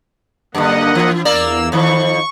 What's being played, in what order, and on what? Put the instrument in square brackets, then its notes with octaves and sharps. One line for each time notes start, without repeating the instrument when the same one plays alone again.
[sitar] F#2 D3 [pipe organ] A#3 D#5 F#5
[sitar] E3
[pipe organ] E2 E6 [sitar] A#3 A#4 D5
[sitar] F2 D#3 [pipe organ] C#6